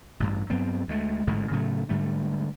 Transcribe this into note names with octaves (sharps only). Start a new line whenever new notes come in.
A1 G2
G2 F#3 B3 C4
D2 G#3 A3
A1 G#2 D3 G#3
A2 C#3 F#3 A3
G#2 D3 G3 A3